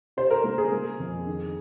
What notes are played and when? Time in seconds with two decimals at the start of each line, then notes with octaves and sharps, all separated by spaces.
0.17 C3 C5
0.31 A#4
0.44 A#3
0.58 G#4
0.72 A#3
1.00 F2
1.27 D#3